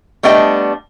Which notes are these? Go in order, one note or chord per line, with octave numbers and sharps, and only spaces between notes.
G3 A3 B3 D4 D#5 G5